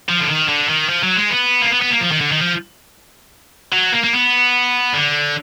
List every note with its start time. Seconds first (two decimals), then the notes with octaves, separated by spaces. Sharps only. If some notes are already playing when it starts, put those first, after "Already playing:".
0.09 F3
0.21 D3
0.29 D#3
0.49 D3
0.70 D#3
0.89 F3
1.03 F#3
1.17 G#3
1.30 B3
1.62 A#3
1.71 B3
1.81 B3
1.91 A#3
2.00 F3
2.12 D#3
2.21 D3
2.32 D#3
2.42 F3
3.73 F#3
3.93 A#3
4.04 A#3
4.13 B3
4.94 D3